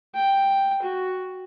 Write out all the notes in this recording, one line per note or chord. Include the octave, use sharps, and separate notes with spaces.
G5
F#4